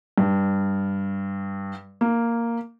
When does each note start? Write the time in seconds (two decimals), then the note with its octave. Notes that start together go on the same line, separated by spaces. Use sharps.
0.18 G2
2.01 A#3